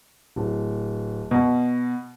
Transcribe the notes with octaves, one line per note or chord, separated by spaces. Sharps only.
D1
B2